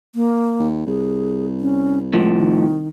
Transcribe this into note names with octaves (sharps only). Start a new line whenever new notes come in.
A#3
D#2
C2 G#4
C#4
A2 F3 G#3
D#3